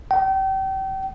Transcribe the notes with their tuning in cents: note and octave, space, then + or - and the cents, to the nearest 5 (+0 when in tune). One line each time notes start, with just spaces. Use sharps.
G5 -35